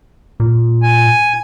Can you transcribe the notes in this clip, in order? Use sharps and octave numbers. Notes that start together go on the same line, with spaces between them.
A#2
G#5